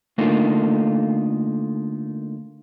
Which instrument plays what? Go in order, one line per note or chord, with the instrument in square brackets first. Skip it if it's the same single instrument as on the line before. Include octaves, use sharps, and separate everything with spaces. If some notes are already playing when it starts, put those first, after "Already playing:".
[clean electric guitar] D3 A3 A#3 D#4 F4